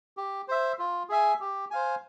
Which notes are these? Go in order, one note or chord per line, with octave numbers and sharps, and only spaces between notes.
G4
C5 E5
F4
G#4 E5 G#5
G4
C5 F5 G#5